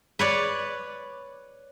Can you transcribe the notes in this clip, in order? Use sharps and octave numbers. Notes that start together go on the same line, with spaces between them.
B4 C#5 D5